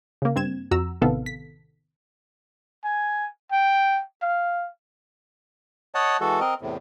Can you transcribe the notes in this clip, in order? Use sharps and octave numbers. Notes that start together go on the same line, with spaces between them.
C#3 A#3
G2 C4 G#6 E7
F2 F#4 A#5 E6
A1 C3 D#3 B3 A4 F5
B6
G#5
G5
F5
C#5 D#5 F#5 A5
E3 G#3 F#4 A4
C4 A#4 D#5
E2 A2 C3